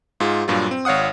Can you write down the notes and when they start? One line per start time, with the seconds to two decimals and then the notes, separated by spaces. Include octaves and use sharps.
0.20 G#2 F4 G#4
0.48 G2 A#2 F#3 F4
0.71 C4
0.85 G#1 C#5 F5 F#5 D#6